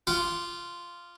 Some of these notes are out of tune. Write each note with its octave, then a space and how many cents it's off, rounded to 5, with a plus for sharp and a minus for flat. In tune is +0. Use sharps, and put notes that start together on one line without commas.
F4 -10 F#5 +30 D6 +0